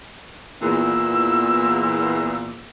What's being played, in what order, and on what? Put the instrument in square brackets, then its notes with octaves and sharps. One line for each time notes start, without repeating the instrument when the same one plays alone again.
[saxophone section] E2 A#2 [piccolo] E6